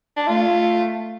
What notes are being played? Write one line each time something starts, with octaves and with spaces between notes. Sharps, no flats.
D4
A3 F4